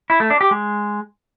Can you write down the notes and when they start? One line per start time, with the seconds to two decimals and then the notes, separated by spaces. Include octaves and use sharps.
0.10 E4
0.20 A3
0.30 D4
0.41 G4
0.51 G#3